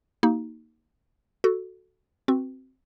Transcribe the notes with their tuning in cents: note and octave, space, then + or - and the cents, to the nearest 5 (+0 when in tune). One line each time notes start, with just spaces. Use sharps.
A#3 +0 D#4 +15 F#4 +45
F#4 +0 A4 +0
C4 +0 F#4 +5 B4 +5